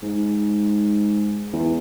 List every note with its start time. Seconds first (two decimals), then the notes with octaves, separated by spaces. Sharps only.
0.03 G#2
1.53 E2